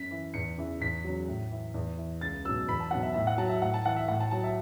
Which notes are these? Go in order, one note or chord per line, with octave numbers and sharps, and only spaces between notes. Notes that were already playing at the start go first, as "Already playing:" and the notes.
Already playing: F#2 B6
E3
E2 C#7
C#3 E3
E2 B6
C#3 F#3
A2
E3
E2
E3
C#2 A6
B2 F#3 E6
E2 B5
A5
B2 F#3 F#5
E5
A2 E5
F#5
F#3 A5
E5
A2 F#5
A5
E3 F#5
E5
A2 F#5
A5
F#3 A5
E5